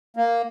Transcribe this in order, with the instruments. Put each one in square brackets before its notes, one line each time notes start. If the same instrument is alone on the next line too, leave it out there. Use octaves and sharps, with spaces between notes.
[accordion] A#3